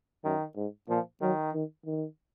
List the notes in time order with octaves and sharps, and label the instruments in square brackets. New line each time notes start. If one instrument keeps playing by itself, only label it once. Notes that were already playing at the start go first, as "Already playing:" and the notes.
[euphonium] F#2 [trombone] D#3
[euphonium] G#2
[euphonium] A#2 [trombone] F3
[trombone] D#3 [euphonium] F#3
[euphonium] D#3
D#3